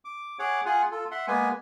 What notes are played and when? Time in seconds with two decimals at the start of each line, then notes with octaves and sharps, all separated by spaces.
0.05 D6
0.39 G#4 C#5 F#5 D6
0.66 F4 G#4 F#5 G#5
0.91 F4 A4
1.11 E5 F#5 C6
1.28 G#3 A#3 B3 B4 G#5